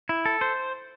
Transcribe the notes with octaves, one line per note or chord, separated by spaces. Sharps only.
E4
A4
C5